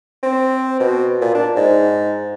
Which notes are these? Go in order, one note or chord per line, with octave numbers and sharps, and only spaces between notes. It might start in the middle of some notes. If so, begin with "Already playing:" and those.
C4
B2
A#2
D4
G#2